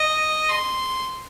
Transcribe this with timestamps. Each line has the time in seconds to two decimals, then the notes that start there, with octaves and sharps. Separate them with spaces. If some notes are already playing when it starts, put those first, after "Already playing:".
Already playing: D#5
0.49 C6